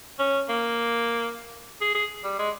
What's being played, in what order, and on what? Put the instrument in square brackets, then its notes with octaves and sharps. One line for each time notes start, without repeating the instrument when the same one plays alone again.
[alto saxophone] C#4
A#3
G#4
G#4
G3
G#3